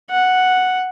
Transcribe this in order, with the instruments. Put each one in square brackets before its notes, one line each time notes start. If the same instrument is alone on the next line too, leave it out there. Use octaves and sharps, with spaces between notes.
[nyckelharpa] F#5